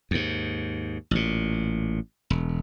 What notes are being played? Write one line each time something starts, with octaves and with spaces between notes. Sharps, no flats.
D#2 G#2
A1 A#2
E1